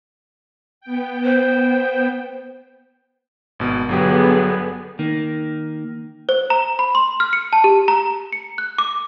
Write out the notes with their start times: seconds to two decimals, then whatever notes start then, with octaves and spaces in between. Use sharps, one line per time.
0.81 B3 G5
1.24 C5
3.59 G#1 B2
3.89 G1 D3 F#3 B3 G4 G#4
4.99 D#3 A#3
6.29 C5
6.50 A#5
6.79 B5
6.95 C6
7.20 F6
7.33 C#7
7.53 A5
7.64 G4
7.88 A#5
8.32 C#7
8.58 F#6
8.78 D6